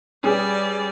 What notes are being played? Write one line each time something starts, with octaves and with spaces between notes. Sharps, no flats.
G3 C#4 G#4 B4 D5